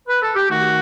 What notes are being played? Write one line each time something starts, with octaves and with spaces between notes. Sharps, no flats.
B4
A4
G4
D#3 A3 D#4 F#4